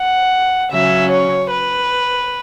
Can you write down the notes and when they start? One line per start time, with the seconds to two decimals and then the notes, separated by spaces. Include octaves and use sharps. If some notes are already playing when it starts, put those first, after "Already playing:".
Already playing: F#5
0.71 C#3 F#3 C#4 E5
1.12 C#5
1.50 B4